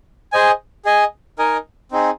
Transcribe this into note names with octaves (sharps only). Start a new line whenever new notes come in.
G#4 C5 D#5 G#5
G#4 D#5 G#5
D#4 A#4 D#5 G#5
C4 D#4 G#4